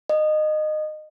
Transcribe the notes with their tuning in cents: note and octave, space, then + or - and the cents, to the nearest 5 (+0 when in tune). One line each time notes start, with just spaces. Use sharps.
D#5 -20